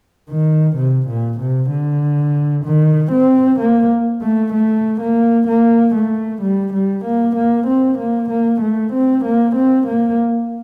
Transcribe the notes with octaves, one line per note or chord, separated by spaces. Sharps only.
D#3
C3
A#2
C3
D3
D#3
C4
A#3
A3
A3
A#3
A#3
A3
G3
G3
A#3
A#3
C4
A#3
A#3
A3
C4
A#3
C4
A#3